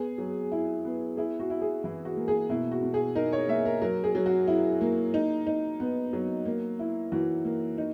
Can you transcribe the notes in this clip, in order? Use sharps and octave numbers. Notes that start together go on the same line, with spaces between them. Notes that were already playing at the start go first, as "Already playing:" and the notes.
Already playing: B3 G#4
F#3
E4
B3
E4 G#4
F#4
E4
G#4
E3 E4
F#4
A#3
G#4
B2 E4
F#4
B2
G#4
D#4 A#4
C#5
A#3 E5
A#4
F#3 A#4
G#4
F#3
F#4
E4
A#3
D#4
D#4
B3
F#3
A#3
E4
E3 F#4
A#3
D#4